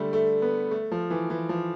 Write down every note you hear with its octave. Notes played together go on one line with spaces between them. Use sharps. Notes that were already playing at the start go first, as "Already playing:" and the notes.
Already playing: D3 G3 A3
A3
B3
A3
F3
E3
E3
F3